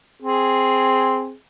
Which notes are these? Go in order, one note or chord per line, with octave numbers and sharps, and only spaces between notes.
C4 G#4